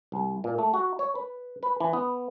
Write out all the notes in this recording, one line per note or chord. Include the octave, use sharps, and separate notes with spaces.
C2
A#2
A3
F#4
C#5
B4
B4
E3
B3